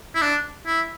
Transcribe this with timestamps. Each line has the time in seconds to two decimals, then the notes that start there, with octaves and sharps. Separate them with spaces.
0.15 E4
0.21 D4
0.67 E4